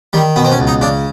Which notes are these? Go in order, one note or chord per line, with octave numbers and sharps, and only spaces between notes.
D#3 G3
B2 B3
C4
C#4
C#2
D#4
C#3 D4